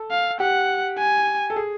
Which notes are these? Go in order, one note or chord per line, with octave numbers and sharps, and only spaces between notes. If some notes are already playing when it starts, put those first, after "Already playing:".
Already playing: A4
F5
G4 F#5
G#5
A4
G#4